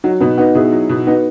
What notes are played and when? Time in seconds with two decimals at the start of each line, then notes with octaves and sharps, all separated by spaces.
0.04 F#3 D#4 F#4
0.20 B2 B3 D#4
0.38 B3 D#4 F#4
0.55 B2 E4 G#4
0.73 F#3
0.90 B2
1.07 B3 D#4 F#4